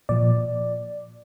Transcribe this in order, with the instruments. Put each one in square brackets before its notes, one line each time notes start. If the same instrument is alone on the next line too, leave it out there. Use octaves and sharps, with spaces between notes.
[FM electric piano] A#2 F3 D5